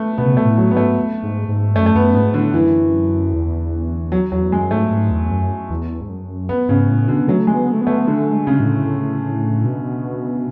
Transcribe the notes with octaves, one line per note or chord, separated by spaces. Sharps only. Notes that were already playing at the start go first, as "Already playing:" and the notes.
Already playing: A3 B3
B2 B3
C#3
B2 A3
A2
F#3
G#2 B3
A3
G#2
G#2
F#2 A3
A3
F#2 B3
G#2 B3
A2 D3
F#2 E3
E2
F#3
E2 F#3
F#2 G#3
G#2 A3
G#2
E2
F#2
E2
G#2
F#2
B3
G#2 C#3
A2
B2 D3
F#3 A3
G#3
B3
A3
B3
A3
D3 A3
G#3
C#3
A2
A2
B2